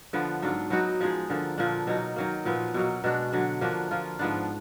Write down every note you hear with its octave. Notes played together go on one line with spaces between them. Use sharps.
D3 F3 B3
G#2 F#3 D4 F4
F#3 B3 D#4 F#4
F3 G#3 D#4 G#4
D3 F3 A#3
A#2 F3 A#3 D4
B2 F#3 A#3 D#4
D#3 F#3 A#3
A#2 F3 B3
B2 F#3 A#3
B2 G#3 D4 F#4
D3 F#3 D4
F3 A#3 D4 F#4
F3 A#3 F4
G#2 F3 B3 D4